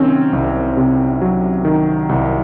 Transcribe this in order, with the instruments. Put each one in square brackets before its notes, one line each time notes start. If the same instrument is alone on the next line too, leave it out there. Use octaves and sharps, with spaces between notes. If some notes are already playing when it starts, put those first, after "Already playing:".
Already playing: [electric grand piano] C3 D#3 F#3 C4 C#4
C2
C3
F#3
D#3
C2